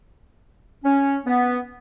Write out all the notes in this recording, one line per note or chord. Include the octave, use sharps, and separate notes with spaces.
C#4
B3